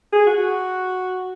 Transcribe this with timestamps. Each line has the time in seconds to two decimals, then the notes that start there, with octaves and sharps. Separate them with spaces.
0.13 G#4
0.27 F#4